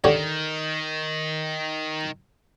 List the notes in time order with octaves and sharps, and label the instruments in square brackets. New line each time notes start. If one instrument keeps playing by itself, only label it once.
[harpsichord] D3 G4 C#5 [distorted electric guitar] D#3